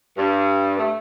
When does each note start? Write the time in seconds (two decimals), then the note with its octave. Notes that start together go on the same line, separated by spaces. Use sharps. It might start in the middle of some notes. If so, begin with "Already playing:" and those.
0.17 G2
0.78 A3